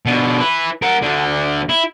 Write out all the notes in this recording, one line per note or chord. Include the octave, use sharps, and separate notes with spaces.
B2 D3
E4 B4
A#4 F#5
D2 D3
E4